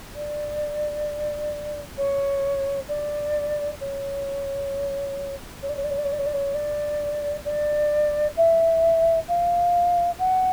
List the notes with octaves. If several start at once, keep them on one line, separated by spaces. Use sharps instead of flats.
D5
C#5
D5
C#5
C#5
D5
C#5
D5
C#5
D5
C#5
D5
C#5
D5
C#5
D5
D5
E5
F5
F#5